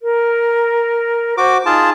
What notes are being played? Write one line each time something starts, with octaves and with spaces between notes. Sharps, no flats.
A#4
F#4 C5 D6
D#4 F4 G#4 A5